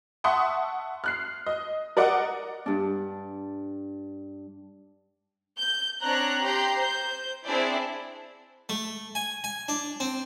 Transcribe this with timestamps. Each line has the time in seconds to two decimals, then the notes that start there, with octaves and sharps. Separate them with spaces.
0.24 E5 F#5 A5 C6 C#6 D#6
1.04 F6 F#6 C7
1.46 D#5
1.97 A#4 D5 D#5 F#5 D6
2.66 G2 D4
5.58 G6
6.02 C4 D4 C#5 A#5 F#6
6.41 G4 A#5 C6 G6
6.77 C5 G6
7.45 C4 D4 E4 G#4 D5
8.69 A3
9.15 G#5
9.44 G#5
9.68 D4
10.00 C4